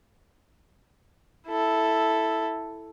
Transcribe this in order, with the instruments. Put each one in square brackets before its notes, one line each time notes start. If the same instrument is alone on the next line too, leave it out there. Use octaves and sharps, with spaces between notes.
[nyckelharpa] E4 A4